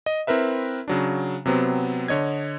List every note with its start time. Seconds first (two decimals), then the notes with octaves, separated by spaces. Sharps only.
0.06 D#5
0.27 C4 E4 A#4 B4 E5
0.88 C#3 F#3 D4
1.46 C3 F#3 B3 C4
2.08 D3 C#5 D#5 G#6